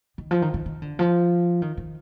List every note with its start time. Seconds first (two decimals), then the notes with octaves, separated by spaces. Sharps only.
0.18 D#3
0.31 F3
0.42 D#3
0.54 D#3
0.66 D#3
0.82 D3
0.99 F3
1.62 D#3
1.77 D#3